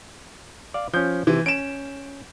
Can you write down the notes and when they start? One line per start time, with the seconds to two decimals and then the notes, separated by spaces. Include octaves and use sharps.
0.74 D5 F5
0.94 F3 C#4 G6
1.27 C3 E3
1.46 C#4 D7 E7